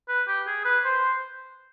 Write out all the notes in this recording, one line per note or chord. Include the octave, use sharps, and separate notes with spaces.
B4
G4
G#4
B4
C5